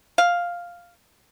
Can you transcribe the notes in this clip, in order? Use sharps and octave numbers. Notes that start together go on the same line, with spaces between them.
F5